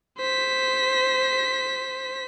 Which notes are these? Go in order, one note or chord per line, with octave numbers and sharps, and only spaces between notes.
C5 B6